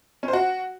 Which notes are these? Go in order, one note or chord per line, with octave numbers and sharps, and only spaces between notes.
C#4
C5
F#4